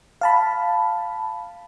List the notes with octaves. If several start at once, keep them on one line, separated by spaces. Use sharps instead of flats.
F5 A5 B5